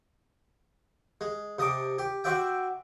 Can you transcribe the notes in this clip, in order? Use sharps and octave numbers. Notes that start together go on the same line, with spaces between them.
G#3
C3 D#5 A5 D6
G4
F#4 C5 D5 E5 G5